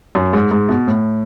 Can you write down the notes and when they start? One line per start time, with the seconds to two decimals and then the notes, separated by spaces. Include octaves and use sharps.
0.15 F#2
0.33 G#2
0.51 G#2
0.69 B2
0.87 A2